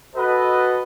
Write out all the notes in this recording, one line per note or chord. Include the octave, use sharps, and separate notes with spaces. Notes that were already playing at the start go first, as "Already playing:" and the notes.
F#4 A4 B4 D#5